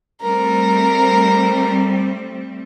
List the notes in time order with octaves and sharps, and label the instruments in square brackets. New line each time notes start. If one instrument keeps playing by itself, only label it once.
[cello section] G3 A3 C4 [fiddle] A#4